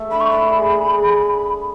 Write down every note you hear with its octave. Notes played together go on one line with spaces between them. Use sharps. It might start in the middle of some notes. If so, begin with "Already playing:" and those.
Already playing: A3
D4 B5
C#6
D4 B5
G#4
G#4
G#4